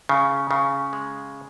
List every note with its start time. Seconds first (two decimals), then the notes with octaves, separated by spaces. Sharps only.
0.09 C#3
0.51 C#3
0.93 G#3